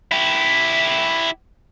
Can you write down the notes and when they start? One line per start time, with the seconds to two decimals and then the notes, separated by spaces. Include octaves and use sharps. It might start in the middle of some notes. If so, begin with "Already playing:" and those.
0.12 E4 G4